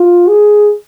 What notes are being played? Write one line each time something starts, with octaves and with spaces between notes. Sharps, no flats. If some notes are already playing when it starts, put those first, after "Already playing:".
Already playing: F4
G#4